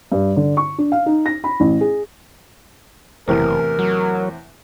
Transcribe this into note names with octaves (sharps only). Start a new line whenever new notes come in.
G2
D3
C#6
D4
F5
D#4
A#6
B5
A1
G#4
F#1 E2 A2 C3 A#4
F#3